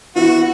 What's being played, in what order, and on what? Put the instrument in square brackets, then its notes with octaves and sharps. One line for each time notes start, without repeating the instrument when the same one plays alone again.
[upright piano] E3 B3 E4 [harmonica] F#4